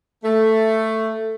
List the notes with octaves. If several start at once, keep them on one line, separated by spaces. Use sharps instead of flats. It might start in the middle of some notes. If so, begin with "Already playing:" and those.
A3